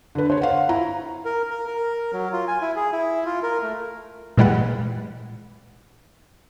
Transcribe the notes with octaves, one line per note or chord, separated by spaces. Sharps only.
D3 B4
C5 C#5
F5 F#5
E4 A#5
A#4
A#4
A#4
F#3
F4
G#5
E4
G#4
E4
F4
A#4
A3
A#2 E3 G3 G#3 B4 F#5